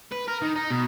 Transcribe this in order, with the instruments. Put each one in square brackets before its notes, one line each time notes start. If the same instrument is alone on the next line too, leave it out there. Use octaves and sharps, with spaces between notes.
[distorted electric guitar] B4
A#4
D#3
D#4
B2